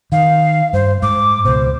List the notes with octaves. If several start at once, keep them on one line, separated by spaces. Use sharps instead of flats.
D#3 F5
G2 C5
G#2 D6
C#2 B2 C5